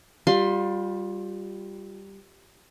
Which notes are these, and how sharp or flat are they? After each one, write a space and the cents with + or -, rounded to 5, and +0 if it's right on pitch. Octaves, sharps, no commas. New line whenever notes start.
G3 +0 F4 +25 C6 +0